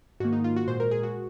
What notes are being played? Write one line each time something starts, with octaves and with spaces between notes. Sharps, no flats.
G#2 D#3 A#3 F#4
D#4
F4
F#4
A#2 G#3 C5
A#4
G#4
F#4